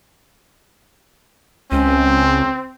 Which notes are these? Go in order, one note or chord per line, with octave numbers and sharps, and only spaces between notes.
C#2 C4 C#4